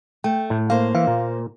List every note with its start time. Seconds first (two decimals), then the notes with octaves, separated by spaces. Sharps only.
0.24 A3 G5
0.50 A2
0.70 A#3 C5 F5
0.95 E3 F5
1.07 A#2